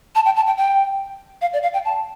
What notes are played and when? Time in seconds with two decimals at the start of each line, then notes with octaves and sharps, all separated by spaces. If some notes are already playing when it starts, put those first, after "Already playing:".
0.15 A5
0.25 G5
0.36 A5
0.47 G5
0.57 G5
1.41 F5
1.53 D5
1.63 F5
1.74 G5
1.85 A5